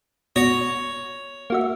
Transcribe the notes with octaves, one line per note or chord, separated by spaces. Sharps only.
B2 C#5 A#6
A#3 F#4 E5